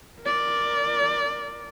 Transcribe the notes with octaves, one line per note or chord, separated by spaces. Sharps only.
A#4 D5